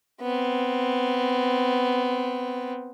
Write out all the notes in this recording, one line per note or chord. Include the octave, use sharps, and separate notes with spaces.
B3 C4